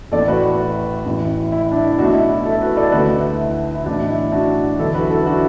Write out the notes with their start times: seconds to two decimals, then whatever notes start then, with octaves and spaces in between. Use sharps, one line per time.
0.12 A1 A2 A3 A4 D5
0.28 F#4 B4
1.06 A1 A2 E3
1.52 E4
1.72 D4
1.84 E4
1.99 B1 B2 A3 D4 F#4
2.14 E4
2.30 E4
2.45 E4 A4
2.61 F#4 B4
2.77 A4 D5
2.92 D2 D3 A3 F#4 B4
3.16 E4
3.75 E4
3.86 B1 A2 E3 D4
4.09 E4
4.32 D4 F#4
4.79 E2 D3 F#3 E4 A4
4.94 F#4 B4
5.10 E4 A4
5.26 D4 F#4